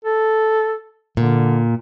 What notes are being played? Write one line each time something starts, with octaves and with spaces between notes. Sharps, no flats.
A4
A#2 D3